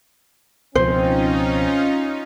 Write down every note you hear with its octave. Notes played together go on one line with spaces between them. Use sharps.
C#2 B2 F3 C4 C#4 D#4 F4 C5